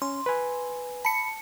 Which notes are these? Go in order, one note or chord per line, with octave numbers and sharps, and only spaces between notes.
C#4 C6
B4 G#5
A5 B5 C#7